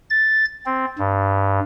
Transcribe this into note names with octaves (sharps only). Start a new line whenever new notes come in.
A6
C4
G2